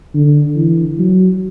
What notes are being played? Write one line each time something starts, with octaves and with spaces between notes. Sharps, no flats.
D3
E3
F#3